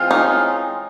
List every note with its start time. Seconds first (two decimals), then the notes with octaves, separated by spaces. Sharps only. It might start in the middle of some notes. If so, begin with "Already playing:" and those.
Already playing: E3 G#3 C4 F4
0.11 C#4 D#4